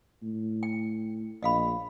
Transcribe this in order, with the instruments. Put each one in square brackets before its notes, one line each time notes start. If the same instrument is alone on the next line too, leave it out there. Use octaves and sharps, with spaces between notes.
[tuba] A2
[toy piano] G5
[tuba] A#1 [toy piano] D#5 F5 B5